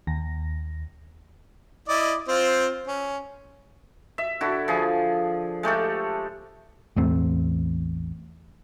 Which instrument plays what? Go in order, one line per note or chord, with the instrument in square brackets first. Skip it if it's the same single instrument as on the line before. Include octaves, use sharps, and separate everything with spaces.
[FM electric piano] D#2 A#6
[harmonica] E4 D5 D#5
C4 F4 C5
C#4
[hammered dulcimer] E5
D3 E4 F#4
F3 G#4
G#3 A3 G4 A4
[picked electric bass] A1 E2 A3 C4